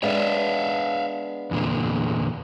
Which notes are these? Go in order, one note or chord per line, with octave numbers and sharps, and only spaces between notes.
G#3 B3 D4 C#5 E5 F5
E2 A#2 D3